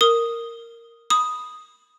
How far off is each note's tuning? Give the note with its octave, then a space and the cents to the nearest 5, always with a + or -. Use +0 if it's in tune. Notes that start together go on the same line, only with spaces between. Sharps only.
A#4 -10 D#6 +0
B5 +0 D#6 +0